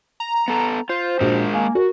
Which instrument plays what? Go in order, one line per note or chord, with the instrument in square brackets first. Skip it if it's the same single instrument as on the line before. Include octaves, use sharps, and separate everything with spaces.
[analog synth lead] A#5
[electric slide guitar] B3 A4
[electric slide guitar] F4 [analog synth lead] C5
[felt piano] A#1 F#4 [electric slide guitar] G#3 G#4 A#4
[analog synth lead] A#3 [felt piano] G#5
[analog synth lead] F#4 [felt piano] A#4